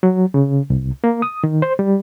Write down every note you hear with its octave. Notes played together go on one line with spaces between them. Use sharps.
F#3
C#3
C2
A#3
D#6
D#3
C5
G3